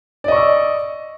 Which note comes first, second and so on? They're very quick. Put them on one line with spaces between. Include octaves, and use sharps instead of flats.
D5 D#5 C#6 E6